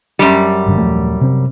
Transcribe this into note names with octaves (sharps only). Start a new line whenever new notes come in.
F#2 G3
G#1 G2 D3
D#1 F3 A3
C3 C4